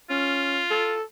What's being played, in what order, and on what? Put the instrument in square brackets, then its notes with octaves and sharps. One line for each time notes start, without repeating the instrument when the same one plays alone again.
[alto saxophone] C#4 [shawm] F4
[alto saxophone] A4